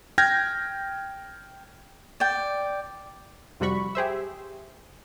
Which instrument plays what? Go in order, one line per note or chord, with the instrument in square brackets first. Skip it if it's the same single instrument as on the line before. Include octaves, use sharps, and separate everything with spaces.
[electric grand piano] G5 F6 G6 G#6 A#6
[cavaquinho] D5 G5
[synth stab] F2 C3 G3 F#4 B5 C#6
G4 G#4 C5 E5